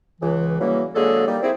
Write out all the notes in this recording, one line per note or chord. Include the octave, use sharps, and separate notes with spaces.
C#2 E3
C#3 E3 F#3 G3 A#3
D3 F#3 G#3 A#3 G#4 A4
G3 A#3 D#4
C4 E4 G#4